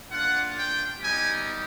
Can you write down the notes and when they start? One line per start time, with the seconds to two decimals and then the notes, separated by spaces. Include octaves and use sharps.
0.11 A#3 D4 F4 F#5
0.57 G5
1.00 G3 B3 D#4 G4 G#5